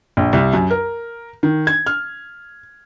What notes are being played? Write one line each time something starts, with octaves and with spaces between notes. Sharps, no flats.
A#1
C2
F#2
A#4
D#3
G#6
F6